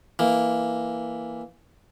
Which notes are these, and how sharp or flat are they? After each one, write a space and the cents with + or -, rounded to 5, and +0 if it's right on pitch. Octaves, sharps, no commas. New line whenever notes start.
E3 +0 A#3 +0